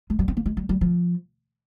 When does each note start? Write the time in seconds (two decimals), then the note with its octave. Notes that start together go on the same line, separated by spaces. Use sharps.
0.10 G#3
0.19 G3
0.28 C4
0.37 A#3
0.46 G#3
0.57 G3
0.69 G3
0.81 F3